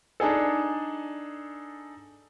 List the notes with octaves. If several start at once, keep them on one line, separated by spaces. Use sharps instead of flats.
D4 D#4 G#4 A4